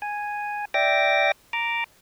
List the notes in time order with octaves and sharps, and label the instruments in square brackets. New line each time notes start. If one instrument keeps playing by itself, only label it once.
[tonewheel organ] G#5
D5 E5 G5 D6 A#6
A#5 D6